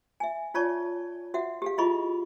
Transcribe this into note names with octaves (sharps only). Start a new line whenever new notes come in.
E5 G#5
F4 C#5 D5 A5 C#6
F#4 E5 F#5
G4 G#4 F5
E4 F4 G#4 D#5 B5 C#6